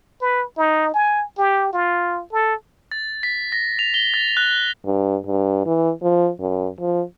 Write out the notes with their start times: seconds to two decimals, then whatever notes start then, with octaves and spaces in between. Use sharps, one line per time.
0.21 B4
0.58 D#4
0.94 G#5
1.38 G4
1.73 F4
2.32 A4
2.92 A6
3.23 B6
3.52 A#6
3.79 F7
3.94 G7
4.14 A6
4.37 F#6
4.86 G2
5.26 G2
5.66 E3
6.03 F3
6.40 F#2
6.80 F3